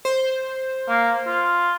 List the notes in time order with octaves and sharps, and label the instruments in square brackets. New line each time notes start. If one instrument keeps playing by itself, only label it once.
[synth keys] C5
[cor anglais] A#3
F4